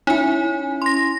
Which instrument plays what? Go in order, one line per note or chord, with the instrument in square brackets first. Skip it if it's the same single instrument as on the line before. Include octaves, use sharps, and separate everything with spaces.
[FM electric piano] C#4 E4 [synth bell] D#4 G#5
[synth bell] C6 A#6